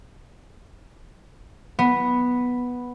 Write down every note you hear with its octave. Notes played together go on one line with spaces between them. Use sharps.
B3